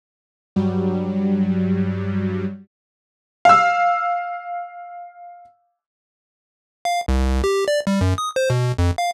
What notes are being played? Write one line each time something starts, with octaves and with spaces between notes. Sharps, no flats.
G2 F#3 G3
F5 E6
F5
C2
G4
D5
G3
F#2
D#6
C5
B2
F2
F5